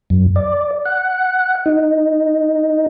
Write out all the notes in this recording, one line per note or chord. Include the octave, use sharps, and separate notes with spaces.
F#2
D5
F#5
D#4